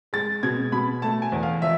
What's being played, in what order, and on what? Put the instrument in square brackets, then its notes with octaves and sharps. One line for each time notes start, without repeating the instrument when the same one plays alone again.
[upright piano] G#3 A6
B2 G#6
B2 B5
A3 A5
G#5
E2
F5
F3 E5